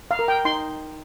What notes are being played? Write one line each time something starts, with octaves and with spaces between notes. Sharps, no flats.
F5
A#4
G5
D#4 C6